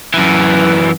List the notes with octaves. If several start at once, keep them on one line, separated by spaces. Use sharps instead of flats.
F#2 E3